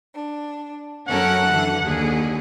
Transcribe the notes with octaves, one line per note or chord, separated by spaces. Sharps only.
D4
F#2 C#4 A4 A#4 F#5 F#6
D3 E3
D#2 D3 G#4